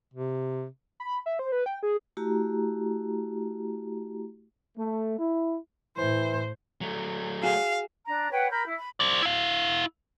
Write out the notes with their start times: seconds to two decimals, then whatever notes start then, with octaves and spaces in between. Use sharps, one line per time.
0.14 C3
1.00 B5
1.26 E5
1.39 C5
1.52 B4
1.66 G5
1.83 G#4
2.17 A3 E4 F#4 G4 A#5
4.78 A3
5.19 E4
5.97 A2 E3 C5
6.81 F#3 A3
7.43 F#4 G#4 F5
8.07 D4 A#5
8.31 B4 C#5 F#5 G5
8.50 A#4 B5 G6
8.65 E4
8.76 B5
9.00 C5 D5
9.22 E4 F5